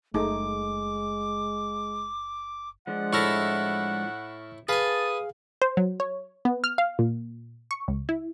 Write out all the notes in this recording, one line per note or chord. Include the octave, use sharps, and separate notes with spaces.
F#1 G#3 A3 D#4 G#4 D6
F3 G#3 D4 F#5
A2 E4 A4 C#6 F6 A#6
G#4 B4 F5 G#5 A5 D#6
C5
F#3
C#5
B3
F6
F5
A#2
C#6
C#2
E4